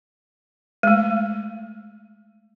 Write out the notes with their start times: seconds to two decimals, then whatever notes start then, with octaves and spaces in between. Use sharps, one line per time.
0.83 G#3 A3